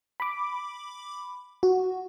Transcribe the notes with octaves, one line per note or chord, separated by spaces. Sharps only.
B5 D6
F#4